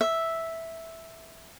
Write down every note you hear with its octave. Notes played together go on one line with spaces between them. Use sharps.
E5